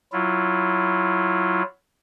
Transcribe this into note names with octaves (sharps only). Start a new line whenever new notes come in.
F#3 E4 F4